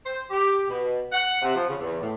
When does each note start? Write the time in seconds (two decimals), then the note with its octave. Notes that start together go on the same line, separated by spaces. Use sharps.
0.06 C5
0.30 G4
0.68 B2
1.12 F#5
1.41 C3
1.54 F3
1.68 C#3
1.80 E2
1.99 A2